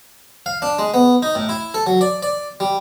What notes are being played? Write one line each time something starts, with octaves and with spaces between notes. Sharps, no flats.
F5
D4
G#3
B3
D#4
A2
E4
A4
F#3
D5
D5
G3